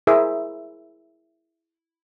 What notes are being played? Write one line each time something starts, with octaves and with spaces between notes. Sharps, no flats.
E4 G#4 A#4 C5 E5